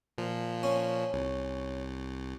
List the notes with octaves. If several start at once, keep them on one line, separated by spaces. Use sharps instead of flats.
A#2 F3
C#4
C2